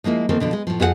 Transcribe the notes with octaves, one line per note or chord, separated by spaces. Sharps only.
F3 G#3 A#3 E4 F4
D#3 E3 A#3 C4 A4
B2 D3 F3
G#3
A2 F3
F2 F4 G#4 A4 F#5